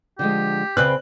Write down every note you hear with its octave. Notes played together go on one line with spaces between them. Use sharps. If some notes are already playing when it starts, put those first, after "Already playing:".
D3 F3 G#3 G4
C#3 C4 B4 D5 F#6